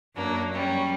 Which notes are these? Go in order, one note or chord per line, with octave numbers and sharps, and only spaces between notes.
F#2 F#3 A#3 D4
F#3 G3 C#4